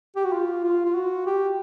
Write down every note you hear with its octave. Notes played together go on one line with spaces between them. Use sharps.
G4
F#4
F4
F4
F4
F#4
G4